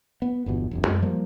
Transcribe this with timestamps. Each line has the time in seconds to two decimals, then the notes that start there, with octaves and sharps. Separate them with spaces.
0.22 B3
0.46 G1 E2 B2
0.71 E1 B1 F#2
0.87 F#2 G#3 C4
1.02 F3 G3 A#3